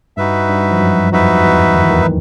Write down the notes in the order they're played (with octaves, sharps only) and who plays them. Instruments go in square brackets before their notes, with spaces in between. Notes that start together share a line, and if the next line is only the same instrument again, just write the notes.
[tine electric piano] G2 G3 [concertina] D#4 F#4 B4 E5
[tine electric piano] G2 G3
F3
F#2 F#3
[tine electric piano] F2 F3 [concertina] D#4 F#4 B4 E5
[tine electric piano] E2 E3
D#3
E3
D#2 D#3